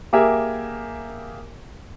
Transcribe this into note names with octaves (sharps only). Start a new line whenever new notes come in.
A#3 G4 G#4 A#4 E5 G#5